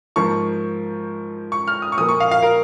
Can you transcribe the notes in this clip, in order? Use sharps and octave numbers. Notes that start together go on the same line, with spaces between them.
G#2 F3 A#3 C#6
C#6
F6
D#6
C#6
A#2 F3 A#3 D#6
C#6
F5
F5
A#4